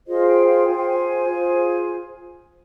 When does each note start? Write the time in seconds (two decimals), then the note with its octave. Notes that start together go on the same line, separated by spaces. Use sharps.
0.06 F4 G#4 C5 D#5
0.27 G5
0.46 G5
0.67 F4 G#4 C5 G#5
0.76 G5
0.86 G#5
1.28 F4 G#4 C5